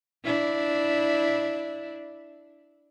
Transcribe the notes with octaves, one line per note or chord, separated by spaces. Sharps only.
D4 E4